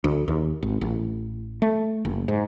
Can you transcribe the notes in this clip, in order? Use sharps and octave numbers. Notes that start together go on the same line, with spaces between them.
D2
D#2
G#1
A1
A3
F#1
G#2